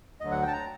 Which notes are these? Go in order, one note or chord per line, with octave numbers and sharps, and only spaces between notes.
D2 D3 F#3 D#5
F#5
G5 A5
A#5